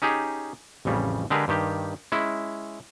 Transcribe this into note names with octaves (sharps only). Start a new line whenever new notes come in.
C#4 D#4 G4 G#4
A1 F2 C#3 G3
D3 G#3 G4 G#4 A#4 B4
G2 D#3 G4
G#3 C#4 E4